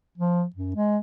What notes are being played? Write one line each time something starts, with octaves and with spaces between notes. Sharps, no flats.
F3
F#2
G#3